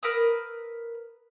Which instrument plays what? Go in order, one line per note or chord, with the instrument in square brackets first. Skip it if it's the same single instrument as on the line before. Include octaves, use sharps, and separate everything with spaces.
[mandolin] A#4 B4 D#6 E6